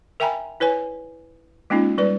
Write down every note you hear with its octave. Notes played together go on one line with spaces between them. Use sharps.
A#4 E5 G5 G#5 A#5 B5
E4 B4 C#5 G#5
G#3 A#3 C#4 D#4 F4
G3 B4 D5